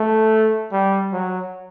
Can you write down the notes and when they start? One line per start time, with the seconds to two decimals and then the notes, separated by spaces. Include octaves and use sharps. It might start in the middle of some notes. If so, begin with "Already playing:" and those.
Already playing: A3
0.72 G3
1.13 F#3